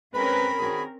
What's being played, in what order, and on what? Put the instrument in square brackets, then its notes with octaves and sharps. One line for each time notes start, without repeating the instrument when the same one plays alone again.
[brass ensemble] G#3 B4 [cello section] C4 C#4 A#4 [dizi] B5
[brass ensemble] D#3 F#4 G#4